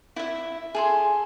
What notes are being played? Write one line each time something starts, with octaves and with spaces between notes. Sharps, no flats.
E4 E5
G#4 A4 C6